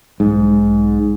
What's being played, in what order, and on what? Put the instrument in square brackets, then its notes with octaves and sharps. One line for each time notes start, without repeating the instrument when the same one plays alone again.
[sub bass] B1 [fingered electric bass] G#2